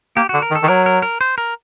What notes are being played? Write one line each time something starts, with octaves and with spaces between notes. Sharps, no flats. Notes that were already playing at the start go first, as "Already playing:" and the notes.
A#3 G4
D3 F#4
A#4
D#3
A4
D#3
F#3 A#4
A#4
A#4
C5
A#4